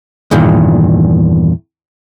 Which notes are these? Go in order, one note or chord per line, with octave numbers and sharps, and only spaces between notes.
E2 G2 A#2 D#3